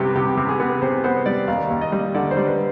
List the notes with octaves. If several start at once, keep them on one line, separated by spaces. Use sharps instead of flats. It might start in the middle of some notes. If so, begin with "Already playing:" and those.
Already playing: C2 C3 B3 G4
C3 G4
C3
G#4
B3
C3 C5
B3 C5
G3 D5
D#2 F5
D#2
D#5
G3
D3 D5
C5
G3
B4